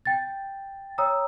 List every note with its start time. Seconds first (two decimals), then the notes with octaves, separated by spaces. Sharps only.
0.05 G5 A6
0.98 C#5 G5 A#5 D#6 E6